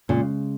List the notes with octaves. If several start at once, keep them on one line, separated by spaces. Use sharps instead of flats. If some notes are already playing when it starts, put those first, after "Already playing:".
A#2 C#3 G#3